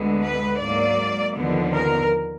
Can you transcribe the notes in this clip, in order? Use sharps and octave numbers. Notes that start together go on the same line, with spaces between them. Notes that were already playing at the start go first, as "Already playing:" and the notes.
Already playing: D2 D3 G#3 B3
B4
G#2 F#3 A#3 D5
D#2 D3 F3 B3
A#4